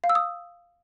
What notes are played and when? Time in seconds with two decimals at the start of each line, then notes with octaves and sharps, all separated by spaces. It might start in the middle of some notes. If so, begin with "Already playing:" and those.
0.04 F5
0.09 E6
0.15 D#6